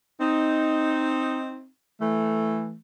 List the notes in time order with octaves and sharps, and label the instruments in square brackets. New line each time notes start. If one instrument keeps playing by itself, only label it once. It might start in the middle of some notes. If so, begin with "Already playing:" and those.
[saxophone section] C4 D#4
E3 A3